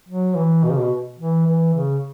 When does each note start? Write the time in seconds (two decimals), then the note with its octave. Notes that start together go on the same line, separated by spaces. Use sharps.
0.08 F#3
0.36 E3
0.64 B2
0.72 C#3
0.79 B2
1.19 E3
1.46 E3
1.74 C#3